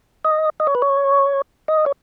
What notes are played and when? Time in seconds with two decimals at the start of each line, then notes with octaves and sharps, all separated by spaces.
0.24 D#5
0.60 D#5
0.67 C#5
0.75 B4
0.82 C#5
1.68 D#5
1.86 C#5